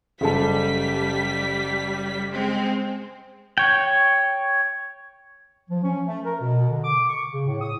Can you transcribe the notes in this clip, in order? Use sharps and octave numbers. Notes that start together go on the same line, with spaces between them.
F#1 G3 A4 A5 B6
G#3 C4
C#5 G5
F3
C#4
A3
A#4
B2
D3
D6
C#6
C#3
A2
D#6